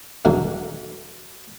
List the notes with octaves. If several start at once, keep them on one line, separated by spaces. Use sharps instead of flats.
E2 G2 B2 D3 F#3